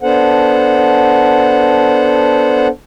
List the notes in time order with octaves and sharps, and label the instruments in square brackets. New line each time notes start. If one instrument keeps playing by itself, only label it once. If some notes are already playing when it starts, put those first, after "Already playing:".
[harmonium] B3 D4 A4 C5 F#5